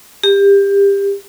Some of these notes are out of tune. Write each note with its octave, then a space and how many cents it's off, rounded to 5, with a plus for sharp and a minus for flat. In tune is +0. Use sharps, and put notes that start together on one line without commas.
G4 +25